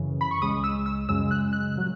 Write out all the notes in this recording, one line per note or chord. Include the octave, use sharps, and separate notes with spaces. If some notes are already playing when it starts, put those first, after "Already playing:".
Already playing: F#2 C#3 E3
B5
C#6
C#2 C#3 G#3 D#6
E6
E6
F#2 C#3 G#3 E6
F#6
F#6
A#2 F#3